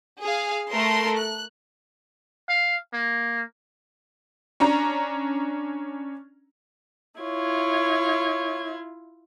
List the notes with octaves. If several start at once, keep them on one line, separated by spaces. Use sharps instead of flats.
G#4 F5
A3 A#4 C6
F#6
F5
A#3
C#4 D4 A#5
E4 F4 C#5 G#6